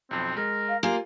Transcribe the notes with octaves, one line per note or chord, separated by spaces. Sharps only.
B1 F2 C4
G#3 A#4
F5
A#3 F4 G4 C5 F5 G#5